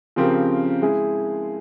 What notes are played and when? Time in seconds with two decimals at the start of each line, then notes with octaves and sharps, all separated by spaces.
0.16 C#3 F3 C4 G4 A#4
0.82 G#3 E4 G#4